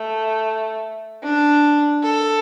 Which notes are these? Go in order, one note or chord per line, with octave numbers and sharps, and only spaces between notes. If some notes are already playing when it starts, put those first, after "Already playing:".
Already playing: A3
D4
A4